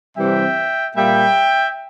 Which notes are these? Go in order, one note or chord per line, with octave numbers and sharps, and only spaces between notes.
C3 E3 G3 C4 E5 G5
A#2 G3 A#3 E5 G5